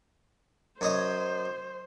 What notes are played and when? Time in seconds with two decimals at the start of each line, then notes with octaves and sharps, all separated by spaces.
0.81 F#2 C5 C#5 D#5